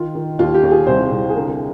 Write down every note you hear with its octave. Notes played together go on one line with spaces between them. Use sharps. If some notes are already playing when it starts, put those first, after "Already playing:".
Already playing: D#3 F4
D#3
D#2 F4
G4
D#2
G#4
C2 C5
C2
G#4
D3 A#4